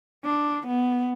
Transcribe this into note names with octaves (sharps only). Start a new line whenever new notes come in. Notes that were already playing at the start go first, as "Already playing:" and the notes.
D4
B3